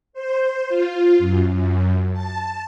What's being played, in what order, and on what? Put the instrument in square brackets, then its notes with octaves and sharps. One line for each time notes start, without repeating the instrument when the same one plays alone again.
[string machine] C5
F4
F#2
F#2
A5